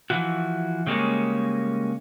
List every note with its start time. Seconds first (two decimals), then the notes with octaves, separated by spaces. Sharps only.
0.10 E3 F3 F#4
0.87 C#3 G3 G#3 A#3 C#4